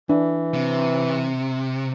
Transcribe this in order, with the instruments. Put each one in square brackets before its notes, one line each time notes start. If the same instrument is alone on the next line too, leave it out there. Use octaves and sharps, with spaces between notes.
[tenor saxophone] E3 [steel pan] D4
[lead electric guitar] C3